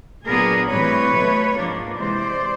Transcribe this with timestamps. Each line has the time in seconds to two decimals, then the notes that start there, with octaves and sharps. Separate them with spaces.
0.26 A#2 F#3 B3 D4 G#4 A#4
0.69 A2 E3 G3 C4 B4 C#5
1.12 B2 F#3 A3
1.54 G#2 F3 A#3 D4
1.96 C3 E3 G#3 C5 D5